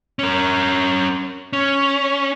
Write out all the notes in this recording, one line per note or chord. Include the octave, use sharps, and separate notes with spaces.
C#4 A#4
C#4